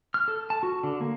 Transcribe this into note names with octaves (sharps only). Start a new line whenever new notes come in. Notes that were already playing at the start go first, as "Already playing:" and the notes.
F6
A4
A5
F#4
D3
A#3